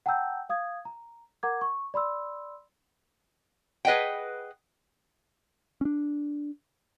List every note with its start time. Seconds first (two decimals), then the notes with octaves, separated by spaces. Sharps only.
0.06 F#5 G5 A5 A#5 E6 G6
0.49 F5 D#6 G#6
0.85 A#5
1.43 A#4 F#5 A#5 D6 G#6
1.61 C#6
1.94 D5 B5 C6 E6
3.85 G#4 B4 D#5 F#5 G5
5.81 C#4 D4